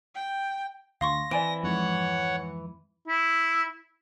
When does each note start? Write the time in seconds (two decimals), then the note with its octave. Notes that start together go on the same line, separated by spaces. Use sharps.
0.15 G5
1.01 D2 F5 C6 C#6 A#6
1.31 E3 C4 D5 G#5 D7
1.63 F2 G#2 C#5 F#5
3.08 E4